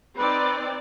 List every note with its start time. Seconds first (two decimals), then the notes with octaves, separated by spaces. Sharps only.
0.18 C4 D#4 B4 D5